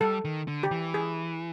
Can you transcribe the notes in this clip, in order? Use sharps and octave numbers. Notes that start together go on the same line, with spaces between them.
G3 A4
D#3
D3
G4
E3
G#4